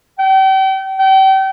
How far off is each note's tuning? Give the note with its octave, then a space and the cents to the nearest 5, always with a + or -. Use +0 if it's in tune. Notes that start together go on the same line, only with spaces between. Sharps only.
G5 -35
G5 -35